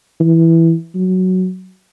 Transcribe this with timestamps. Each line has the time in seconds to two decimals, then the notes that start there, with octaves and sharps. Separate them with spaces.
0.20 E3
0.95 F#3